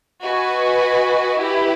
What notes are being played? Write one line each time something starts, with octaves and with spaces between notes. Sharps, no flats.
F#4 B4 D#5 G#5
E4 G4 B4